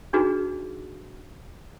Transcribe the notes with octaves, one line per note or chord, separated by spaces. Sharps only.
D4 D#4 F#4 G#4 B4